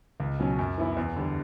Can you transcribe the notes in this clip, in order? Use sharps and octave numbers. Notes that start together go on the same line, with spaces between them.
C#2
B2 F#3 C#4
F#2
E3 B3 E4
E2
D3 G3